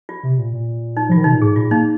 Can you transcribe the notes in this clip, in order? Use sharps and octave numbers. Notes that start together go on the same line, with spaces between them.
F4
C3
A#2
A#2
D#4
F3 F4
D#3
C3 D#4
A#2
G#2 G#4
A#2 F4
A#3 D#4